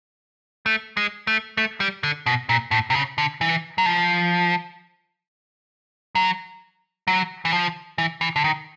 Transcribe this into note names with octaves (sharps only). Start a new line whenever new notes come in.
A3
G#3
A3
A3
G3
D3
B2
A#2
A2
C3
C#3
D3
E3
F#3
F3
F#3
F#3
E3
F3
E3
E3
D3
D#3